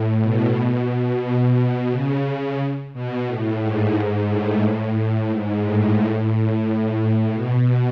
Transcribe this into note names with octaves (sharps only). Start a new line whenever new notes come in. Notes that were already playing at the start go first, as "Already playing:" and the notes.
Already playing: A2
B2
B2
B2
C#3
B2
A2
G#2
G#2
A2
G#2
A2
A2
A2
B2